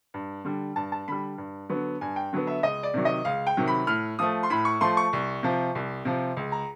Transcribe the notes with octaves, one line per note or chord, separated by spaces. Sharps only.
G2
D3 G3
G2 A5
A5
D3 G3 B5
G2
D3 F#3 B3
G2 G#5
G5
D3 F#3 B3
E5
C#2 D#5
D5
C3 D#3 F#3
D#5
C#2 F5
G5
C3 D#3 F#3
B5
A2 F6
F3 A3 D#6
C6
A2 B5
C#6
F3 A3 C6
C#6
C2
C3 F3
C2
C3 F3
C#2
A#5